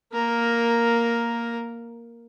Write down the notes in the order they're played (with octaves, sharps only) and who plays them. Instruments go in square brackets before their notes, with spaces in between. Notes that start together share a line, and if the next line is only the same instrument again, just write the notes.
[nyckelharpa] A#3 A#4